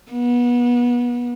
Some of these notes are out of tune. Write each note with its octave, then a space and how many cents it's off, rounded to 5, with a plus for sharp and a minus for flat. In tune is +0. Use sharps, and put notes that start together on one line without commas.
B3 -25